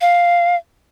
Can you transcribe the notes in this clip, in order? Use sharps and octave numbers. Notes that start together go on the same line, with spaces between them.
F5